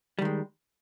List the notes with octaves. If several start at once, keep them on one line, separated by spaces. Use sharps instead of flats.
D#3 G3 G#3